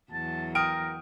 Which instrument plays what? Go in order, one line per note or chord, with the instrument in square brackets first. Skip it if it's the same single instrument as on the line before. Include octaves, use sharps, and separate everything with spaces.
[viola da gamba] E2 F#3 [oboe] A5
[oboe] A#4 [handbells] G5 [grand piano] D#6 F6 D7